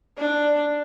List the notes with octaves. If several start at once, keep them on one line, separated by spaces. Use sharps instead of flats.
D4